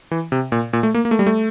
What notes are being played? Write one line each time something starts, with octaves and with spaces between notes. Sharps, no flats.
E3
C3
A#2
A#2
A3
A#3
A#3
A3
G3
A3